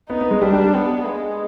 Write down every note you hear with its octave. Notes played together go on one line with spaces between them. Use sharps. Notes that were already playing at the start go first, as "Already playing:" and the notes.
B3 D#4
B3
G#3
G3 D4
G3
G3
B3
G#3